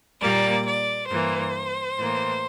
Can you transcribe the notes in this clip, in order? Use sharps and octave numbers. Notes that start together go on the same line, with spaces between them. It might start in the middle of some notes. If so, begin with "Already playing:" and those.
A#2 G3 A#3 D5
D5
G2 E3 A#3 C5
A2 E3 A#3